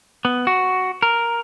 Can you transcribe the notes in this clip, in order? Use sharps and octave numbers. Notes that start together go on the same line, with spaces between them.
B3
F#4
A#4